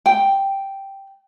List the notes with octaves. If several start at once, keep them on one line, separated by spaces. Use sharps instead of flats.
G5